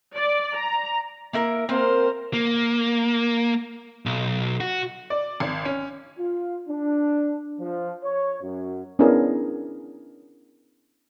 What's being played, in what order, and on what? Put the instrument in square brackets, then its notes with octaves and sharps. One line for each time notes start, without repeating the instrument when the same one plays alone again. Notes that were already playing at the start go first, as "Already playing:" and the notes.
[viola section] D5
A#5
[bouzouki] A#3 E4 A#4
[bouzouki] A#3 C4 [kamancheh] A#4 C5
[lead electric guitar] A#3
B1
F#4
[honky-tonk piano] D5
G#1
C#4
[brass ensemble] F4
D4
F3
C#5
F#2
[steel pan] B3 C#4 D4 E4 G#4 A#4